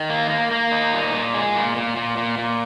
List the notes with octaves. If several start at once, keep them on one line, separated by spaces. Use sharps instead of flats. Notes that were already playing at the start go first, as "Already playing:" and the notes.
Already playing: D#3
A#3
A#3
A#3
D#4
A#2
A#2
G#3
A#2
A#2
A#2
A#2
A#2